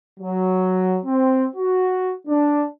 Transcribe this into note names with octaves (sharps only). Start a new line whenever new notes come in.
F#3
C4
F#4
D4